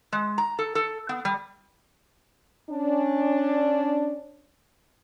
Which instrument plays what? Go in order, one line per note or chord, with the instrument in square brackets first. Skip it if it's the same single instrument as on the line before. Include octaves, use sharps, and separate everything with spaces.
[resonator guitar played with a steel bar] G#3
A#5
A4
A4
B3
G3
[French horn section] C#4 D4